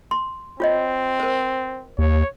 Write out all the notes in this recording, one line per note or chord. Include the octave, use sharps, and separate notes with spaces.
C6
C4 F4 C#5 D#5
A#4 C5
D#2 C#5